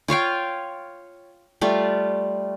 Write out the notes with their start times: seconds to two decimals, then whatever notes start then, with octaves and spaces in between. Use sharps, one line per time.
0.08 F4 C#5 F5 G5
1.61 G3 A3 F4